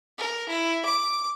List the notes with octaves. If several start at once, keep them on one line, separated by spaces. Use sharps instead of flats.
A#4
E4
D6